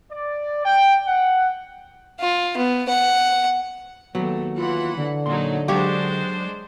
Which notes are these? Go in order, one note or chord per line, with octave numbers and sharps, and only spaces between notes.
D5
G5
F#5
F4
B3
F#5
D#2 F#3 A3 B3
E3 F4 F#5 B5
D3
A#2 F#3 D#4 C6
F#3 G#3 D4 G4 C5 C#5 F5